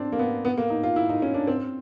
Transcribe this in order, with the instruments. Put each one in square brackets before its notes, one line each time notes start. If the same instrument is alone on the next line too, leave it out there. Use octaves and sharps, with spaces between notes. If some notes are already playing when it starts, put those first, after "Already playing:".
Already playing: [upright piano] C4 D4
A#3
B3
B3
A#3
D#4
F4
E4
D#4
C#4
D4
C4